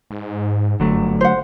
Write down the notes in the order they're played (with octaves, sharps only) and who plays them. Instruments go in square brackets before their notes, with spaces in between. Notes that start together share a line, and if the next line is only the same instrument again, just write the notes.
[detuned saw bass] G#2
[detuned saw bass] G1 [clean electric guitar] D3 F#3 A3
[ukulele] C5 F#5